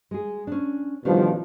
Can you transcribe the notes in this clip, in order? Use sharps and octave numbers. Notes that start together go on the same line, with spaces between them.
G#3 G#4
C#4 D4
A1 B2 D#3 F3 G3 D4